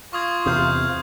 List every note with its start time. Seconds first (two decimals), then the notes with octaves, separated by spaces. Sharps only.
0.13 F4 C#6 D#6 G#6
0.46 E2 C3 C5 F5 D#6 G6